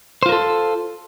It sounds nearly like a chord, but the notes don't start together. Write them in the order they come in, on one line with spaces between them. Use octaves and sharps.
C5 F4 A#4 A4